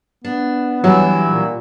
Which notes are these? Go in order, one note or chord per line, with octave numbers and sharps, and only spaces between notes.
B3 D4
E3 F#3 G3 E4 F#4
A#2